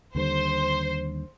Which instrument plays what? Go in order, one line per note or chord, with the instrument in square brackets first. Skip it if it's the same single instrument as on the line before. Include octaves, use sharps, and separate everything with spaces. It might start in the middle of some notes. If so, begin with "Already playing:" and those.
[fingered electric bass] D#2 D3 G3 [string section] C5